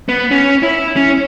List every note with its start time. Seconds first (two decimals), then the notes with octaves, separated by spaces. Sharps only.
0.09 B3
0.31 C#4
0.63 E4
0.96 C#4